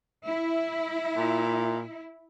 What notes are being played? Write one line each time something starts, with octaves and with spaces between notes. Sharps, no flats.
E4
A#2